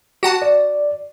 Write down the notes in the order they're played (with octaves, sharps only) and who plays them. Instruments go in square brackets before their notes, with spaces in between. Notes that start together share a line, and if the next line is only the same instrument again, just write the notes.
[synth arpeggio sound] F#4 F#5 A5
[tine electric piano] D5